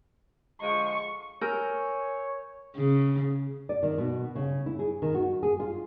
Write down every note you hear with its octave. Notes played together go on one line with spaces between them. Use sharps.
D3 F3 G#3 C#6
A#4 C#5 G#5 E6 G6
C#3
D5
D#3
B2
C#3
E4
G#4
D#3
F#4
G#4
F4